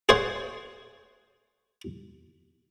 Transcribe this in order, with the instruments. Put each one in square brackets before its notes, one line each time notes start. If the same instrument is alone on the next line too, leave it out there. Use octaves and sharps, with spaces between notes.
[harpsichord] G#4 C5 C#5 F#5